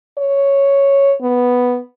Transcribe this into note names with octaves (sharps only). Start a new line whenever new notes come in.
C#5
B3